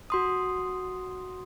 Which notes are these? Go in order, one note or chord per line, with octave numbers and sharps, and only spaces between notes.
F#4 C6 D#6